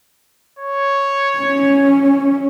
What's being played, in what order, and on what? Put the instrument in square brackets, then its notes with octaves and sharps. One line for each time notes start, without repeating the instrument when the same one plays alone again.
[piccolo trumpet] C#5
[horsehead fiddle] C#4